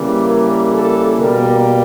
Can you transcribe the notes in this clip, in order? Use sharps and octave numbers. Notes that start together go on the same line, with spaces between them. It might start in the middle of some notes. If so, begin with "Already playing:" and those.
Already playing: C#3 E3 G3 A#3
A#4
A4
B2 G3 A#3 A#4